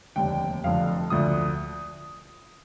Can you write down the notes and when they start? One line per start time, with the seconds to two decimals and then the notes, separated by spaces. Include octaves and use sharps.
0.16 F1 D#2 D3 G5
0.64 F1 F2 D3 F5
1.10 D2 D3 F3 D#6